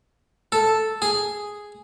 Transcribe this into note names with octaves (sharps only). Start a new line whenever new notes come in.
A4
G#4